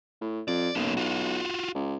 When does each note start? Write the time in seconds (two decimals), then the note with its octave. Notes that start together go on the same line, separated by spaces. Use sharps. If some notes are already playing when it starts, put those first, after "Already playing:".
0.21 A2
0.48 F2 D5
0.75 B1 A#3 C#4
0.97 F4 F#4
1.75 C#2